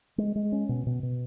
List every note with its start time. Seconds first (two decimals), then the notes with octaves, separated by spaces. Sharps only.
0.18 G#3
0.36 G#3
0.52 C#4
0.69 B2
0.87 B2
1.03 B2